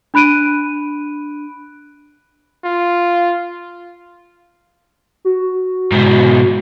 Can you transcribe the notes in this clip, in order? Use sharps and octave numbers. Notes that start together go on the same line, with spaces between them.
D4 B5 F#6 D7 D#7
F4
F#4
G#2 B2